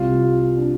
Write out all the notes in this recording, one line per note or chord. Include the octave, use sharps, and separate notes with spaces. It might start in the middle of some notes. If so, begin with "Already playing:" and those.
Already playing: C2 C3 G3 C4 F4
D4